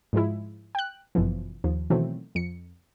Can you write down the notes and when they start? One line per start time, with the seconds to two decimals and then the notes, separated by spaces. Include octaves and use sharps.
0.13 G#2 F3 G#3 E4
0.75 G5 F#6
1.15 G1 F#2 B2 E3 F3
1.64 D#2 F3
1.90 B2 D#3 E3 F#3 A3 C4
2.35 F2 C#7